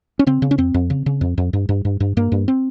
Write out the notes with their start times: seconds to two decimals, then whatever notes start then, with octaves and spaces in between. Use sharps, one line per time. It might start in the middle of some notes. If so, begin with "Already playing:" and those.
0.19 C#4
0.27 C#3 C4
0.42 C#3
0.51 C#4
0.58 F2 C4
0.74 F2
0.90 C#3
1.06 C#3
1.21 F2
1.38 F2
1.53 G2
1.69 G2
1.85 G2
2.00 G2
2.17 G2 A#3
2.32 G2
2.48 C4